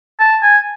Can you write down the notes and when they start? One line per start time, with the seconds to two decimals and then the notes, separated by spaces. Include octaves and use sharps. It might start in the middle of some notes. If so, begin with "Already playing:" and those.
0.20 A5
0.43 G#5